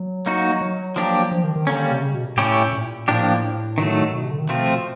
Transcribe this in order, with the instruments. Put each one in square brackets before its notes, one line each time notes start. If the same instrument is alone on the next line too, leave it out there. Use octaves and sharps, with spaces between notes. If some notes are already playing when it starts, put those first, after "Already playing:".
Already playing: [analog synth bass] F#3
[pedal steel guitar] A#3 D#4 F#4
[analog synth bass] F#3
[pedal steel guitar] F3 A#3 D4 G4
[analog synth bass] F3
D#3
D#3
[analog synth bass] D3 [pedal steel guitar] G3 A#3 C#4
[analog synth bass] C3
C#3
B2
[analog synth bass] A2 [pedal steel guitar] A3 C#4 E4 G4
[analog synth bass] A#2
[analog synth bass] A2 [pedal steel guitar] F3 A#3 D4 G4
[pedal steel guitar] D#3 F#3 A3
[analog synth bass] B2
C3
D3
D#3
[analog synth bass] B2 [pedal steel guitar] F3 A3 C4 F4